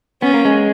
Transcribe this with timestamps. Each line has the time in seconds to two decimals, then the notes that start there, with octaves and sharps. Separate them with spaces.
0.22 B3 C#4
0.34 A#3
0.45 G#3